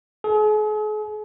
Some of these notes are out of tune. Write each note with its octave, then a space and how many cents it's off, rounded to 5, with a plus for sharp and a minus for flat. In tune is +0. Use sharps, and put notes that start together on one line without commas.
G#4 +45